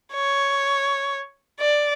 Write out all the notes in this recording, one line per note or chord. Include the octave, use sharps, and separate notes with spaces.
C#5
D5